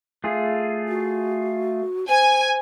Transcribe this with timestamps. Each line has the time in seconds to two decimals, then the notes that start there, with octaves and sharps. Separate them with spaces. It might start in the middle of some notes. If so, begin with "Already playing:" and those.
0.24 A3 F4 G#4
0.88 F#4
2.09 C5 G#5